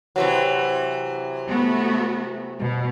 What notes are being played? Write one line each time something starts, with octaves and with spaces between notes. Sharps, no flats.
C3 E3 F#3
A3 B3 F#4
B2